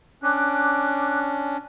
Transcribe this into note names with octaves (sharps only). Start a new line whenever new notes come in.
C#4 D4 D6 F#6